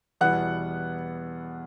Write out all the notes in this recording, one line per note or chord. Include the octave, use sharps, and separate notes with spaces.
E2 B2 G3 B3 E4 F#5 F#6